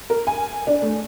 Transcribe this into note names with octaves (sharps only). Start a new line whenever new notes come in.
A#4
G#5
D4
A3